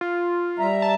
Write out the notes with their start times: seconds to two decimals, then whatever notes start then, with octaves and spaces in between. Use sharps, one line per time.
0.01 F4
0.59 G3 E5 A#5
0.82 A5